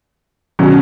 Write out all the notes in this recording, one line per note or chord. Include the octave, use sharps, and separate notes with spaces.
B2 F#3 C#4